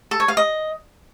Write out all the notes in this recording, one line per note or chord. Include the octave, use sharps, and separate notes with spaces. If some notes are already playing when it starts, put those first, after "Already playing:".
A4
C#5
F5
D#5